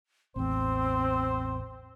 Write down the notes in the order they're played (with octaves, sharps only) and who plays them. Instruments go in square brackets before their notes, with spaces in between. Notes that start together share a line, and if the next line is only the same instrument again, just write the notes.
[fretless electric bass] A1 E2 [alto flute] C4 [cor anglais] C5